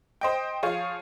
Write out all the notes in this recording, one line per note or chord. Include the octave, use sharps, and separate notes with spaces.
C5 D#5 G5
F3 G#4 C#5 F5